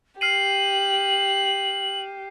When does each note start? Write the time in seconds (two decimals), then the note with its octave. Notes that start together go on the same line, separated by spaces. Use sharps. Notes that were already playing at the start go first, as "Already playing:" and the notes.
0.21 G4 F6 C7 D#7 F#7